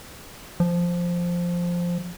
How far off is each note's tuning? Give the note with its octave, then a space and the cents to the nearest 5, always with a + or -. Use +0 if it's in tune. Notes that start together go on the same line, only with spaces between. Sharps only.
F3 +0